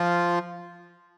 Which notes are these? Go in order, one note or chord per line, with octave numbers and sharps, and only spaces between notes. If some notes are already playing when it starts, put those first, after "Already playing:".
Already playing: F3 F4